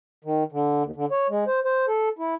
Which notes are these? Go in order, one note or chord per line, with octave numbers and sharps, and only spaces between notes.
D#3
D3
D#2
D3
C#5
G#3
C5
C5
A4
E4